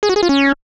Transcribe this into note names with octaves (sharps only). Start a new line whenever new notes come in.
G#4
F#4
G#4
F4
C#4